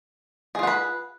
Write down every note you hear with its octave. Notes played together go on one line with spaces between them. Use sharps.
F4 G#4 B4 F#5